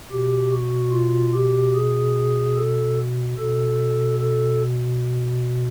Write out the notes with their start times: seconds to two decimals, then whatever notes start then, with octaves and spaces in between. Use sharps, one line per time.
0.11 B2 G4
0.51 F#4
0.92 F4
1.34 G4
1.74 G#4
2.56 A4
3.37 B2 A4
4.19 A4